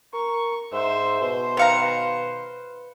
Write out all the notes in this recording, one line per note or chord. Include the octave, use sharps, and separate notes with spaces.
A#4 C#6
G#2 C5 E5
B2 C5
D#3 B4 F5 A#5 C#7